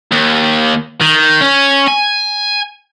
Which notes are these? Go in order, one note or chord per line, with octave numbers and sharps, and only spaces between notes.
D#2
D#3
C#4
G#5